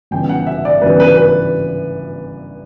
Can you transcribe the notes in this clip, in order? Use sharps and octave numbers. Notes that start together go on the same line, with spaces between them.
G1 F#2 C#3 E3 G5
F#5
E5
D5
G1 F#2 C#3 E3 B4
B4
B4